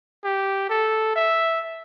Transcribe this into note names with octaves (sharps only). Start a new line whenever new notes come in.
G4
A4
E5